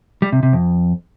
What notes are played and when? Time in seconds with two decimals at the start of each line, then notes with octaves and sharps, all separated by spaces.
0.22 G3
0.32 C3
0.43 C3
0.53 F2